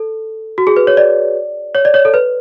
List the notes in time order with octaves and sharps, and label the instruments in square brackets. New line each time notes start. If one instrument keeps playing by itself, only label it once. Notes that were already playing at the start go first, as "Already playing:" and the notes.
Already playing: [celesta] A4
F#4
G#4
B4
C#5
D5
C#5
D5
C#5
A4
B4